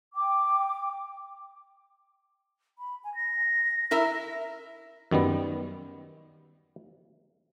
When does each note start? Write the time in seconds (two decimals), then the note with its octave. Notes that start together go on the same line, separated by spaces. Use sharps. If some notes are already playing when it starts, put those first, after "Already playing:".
0.15 G5 D6
2.78 B5
3.04 G#5
3.15 A#6
3.91 E4 A#4 E5
5.11 F#2 D#3 G3 B3